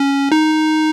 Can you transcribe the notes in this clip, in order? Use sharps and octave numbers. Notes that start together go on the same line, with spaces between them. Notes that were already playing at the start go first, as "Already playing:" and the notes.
Already playing: C#4
D#4